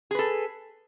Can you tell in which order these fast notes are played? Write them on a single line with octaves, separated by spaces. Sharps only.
G#4 B4 A4